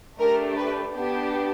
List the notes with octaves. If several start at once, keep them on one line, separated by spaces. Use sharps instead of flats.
A3 D4 G4 A#4
B4
B3 D4 G4